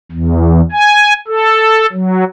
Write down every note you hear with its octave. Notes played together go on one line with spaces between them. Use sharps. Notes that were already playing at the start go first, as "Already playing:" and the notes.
E2
G#5
A4
F#3